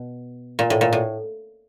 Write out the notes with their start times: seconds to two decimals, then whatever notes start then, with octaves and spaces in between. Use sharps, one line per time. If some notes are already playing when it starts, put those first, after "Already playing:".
Already playing: B2
0.59 A#2
0.70 A2
0.81 A#2
0.93 A2